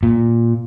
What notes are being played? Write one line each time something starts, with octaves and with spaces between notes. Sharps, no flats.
A#2